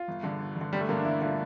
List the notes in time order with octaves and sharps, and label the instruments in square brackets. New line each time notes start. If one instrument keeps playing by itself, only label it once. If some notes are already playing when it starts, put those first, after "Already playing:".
Already playing: [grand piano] F4
[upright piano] G1
G2 D3
G1
G2 D3
[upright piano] G1 [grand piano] G3
[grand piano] A3
[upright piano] G2 D3 [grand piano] A#3
[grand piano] D4
[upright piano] G1 [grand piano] E4
[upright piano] D3 [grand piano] F4